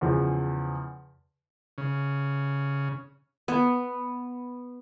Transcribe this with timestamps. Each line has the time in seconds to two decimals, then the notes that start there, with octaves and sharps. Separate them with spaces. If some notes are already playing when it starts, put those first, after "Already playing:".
0.01 E2 C#3 F3
1.78 C#3
3.48 B3